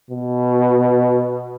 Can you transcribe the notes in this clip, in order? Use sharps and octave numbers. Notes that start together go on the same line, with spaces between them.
B2